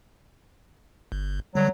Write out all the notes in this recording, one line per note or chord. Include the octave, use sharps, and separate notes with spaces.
G1
D3 F#3 G3